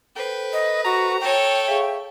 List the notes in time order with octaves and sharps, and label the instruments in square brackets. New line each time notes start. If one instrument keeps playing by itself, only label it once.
[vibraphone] A4 C5 [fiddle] B4 [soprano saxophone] G5
[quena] D#5
[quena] F#4 [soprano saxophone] A#5
[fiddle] A4 C#5 [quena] G5
[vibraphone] G#4 F5 C#6 [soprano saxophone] E5